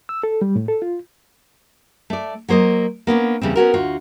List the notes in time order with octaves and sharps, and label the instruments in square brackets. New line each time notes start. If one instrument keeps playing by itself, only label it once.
[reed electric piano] E6
A4
G3
A2
A4
F4
[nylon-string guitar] A3 D5
F#3 A#3 C5 D5 D#5
A#3 B3 C#4 D4
E2 C#3 G3 C4
B3 C#4 F#4 A#4
D2 F4 F#4